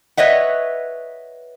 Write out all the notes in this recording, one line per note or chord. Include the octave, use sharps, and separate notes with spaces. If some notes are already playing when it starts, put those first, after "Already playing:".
B4 C#5 D#5 E5 F#5